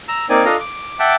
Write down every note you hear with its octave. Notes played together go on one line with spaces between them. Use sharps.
A#5 E6
A#3 C4 D#4 D5 G#5
D4 F4 A4 D#5 F5 A#5
D6
E5 F#5 G5 A5 D6